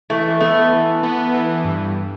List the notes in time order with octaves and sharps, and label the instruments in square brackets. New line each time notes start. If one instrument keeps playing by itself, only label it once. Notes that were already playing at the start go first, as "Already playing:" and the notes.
[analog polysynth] E3 [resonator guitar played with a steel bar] A3
[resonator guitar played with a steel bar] A3 [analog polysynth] B3
[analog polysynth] E3
B3
E3
G2